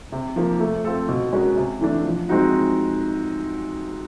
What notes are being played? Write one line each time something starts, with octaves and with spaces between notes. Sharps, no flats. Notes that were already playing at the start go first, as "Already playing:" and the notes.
C3
F3 A#3
A3
C4 F4 A4
B2
G#3 C#4 F#4 A#4
C3
E3 A3 D4
F3
G#3 C4 D#4 F#4